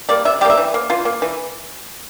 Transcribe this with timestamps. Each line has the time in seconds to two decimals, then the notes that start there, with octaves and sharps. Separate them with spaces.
0.09 G3 A#3 D5
0.25 C3 E5
0.41 G3 G4
0.45 A#3 E5
0.58 E3
0.74 A#3
0.90 E3 F4
1.05 A#3
1.22 E3